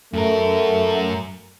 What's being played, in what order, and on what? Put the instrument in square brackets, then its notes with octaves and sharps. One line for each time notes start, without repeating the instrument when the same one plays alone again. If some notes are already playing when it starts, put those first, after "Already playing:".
[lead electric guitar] F#2 A#4 [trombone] A3